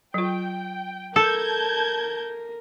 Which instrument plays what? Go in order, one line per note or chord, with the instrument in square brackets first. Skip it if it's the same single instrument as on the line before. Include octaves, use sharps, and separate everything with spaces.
[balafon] F#3 F4 [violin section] G5
[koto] A4 [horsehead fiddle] A#4 [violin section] A5 G6 G#6